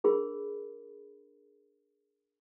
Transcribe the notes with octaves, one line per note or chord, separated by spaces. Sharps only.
D4 G#4 A#4 B5